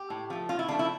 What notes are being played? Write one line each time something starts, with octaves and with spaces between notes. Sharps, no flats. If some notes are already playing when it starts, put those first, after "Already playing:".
Already playing: G4
A2
F3 A3
A2 F4
E4
F3 A3 D4
E4